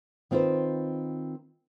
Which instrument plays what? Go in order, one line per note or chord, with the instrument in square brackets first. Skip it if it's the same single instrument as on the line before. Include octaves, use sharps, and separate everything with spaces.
[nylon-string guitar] D#3 C4 F4 B4 C5